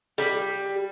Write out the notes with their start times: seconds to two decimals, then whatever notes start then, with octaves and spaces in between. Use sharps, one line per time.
0.18 G3